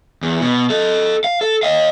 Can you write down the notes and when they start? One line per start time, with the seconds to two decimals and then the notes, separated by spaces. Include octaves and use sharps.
0.23 E2
0.41 B2
0.70 A4 D#5
1.24 F5
1.41 A4
1.63 D#5 F5